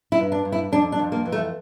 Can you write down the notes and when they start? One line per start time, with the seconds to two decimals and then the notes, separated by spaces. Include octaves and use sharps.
0.12 E4
0.19 G2
0.32 D4
0.45 G2
0.52 E4
0.72 F2 D4
0.92 D4
0.99 F2
1.12 A#3
1.25 E3
1.32 A3